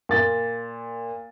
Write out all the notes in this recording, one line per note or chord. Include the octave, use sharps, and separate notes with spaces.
A#2 A6